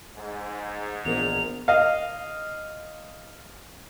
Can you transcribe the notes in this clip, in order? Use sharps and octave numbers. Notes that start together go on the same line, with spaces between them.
G#2
A#1 E3 B3 A#4 F7
D#5 F5